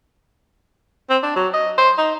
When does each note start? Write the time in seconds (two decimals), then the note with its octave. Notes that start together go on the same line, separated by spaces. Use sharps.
1.10 C4
1.23 D4
1.36 F#3
1.53 D#5
1.78 C5
1.98 D#4